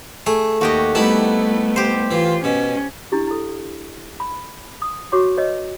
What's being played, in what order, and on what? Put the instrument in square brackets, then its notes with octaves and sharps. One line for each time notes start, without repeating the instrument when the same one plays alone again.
[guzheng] A3 [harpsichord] G#4
[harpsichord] D#2 [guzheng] F#4 G4 D#5
[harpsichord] C2 D#4 E4 [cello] A3 B3 [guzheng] A5 B5
[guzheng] G4 C5
[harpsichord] E3 [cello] F4
[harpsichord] B2 [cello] C#4
[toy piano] D4 E4 G4
E4 A4
B5
D#6
F#4 C#5 C#6 D6
B4 C#5 D#5